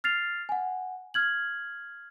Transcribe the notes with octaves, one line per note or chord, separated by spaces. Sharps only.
F6 A6 C7 F7
F#5 G#5
F6 G#6 F#7